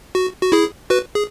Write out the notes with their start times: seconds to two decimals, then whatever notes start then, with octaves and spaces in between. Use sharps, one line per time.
0.15 F#4
0.42 F#4
0.52 E4 G#4
0.90 F#4 B4
1.15 G#4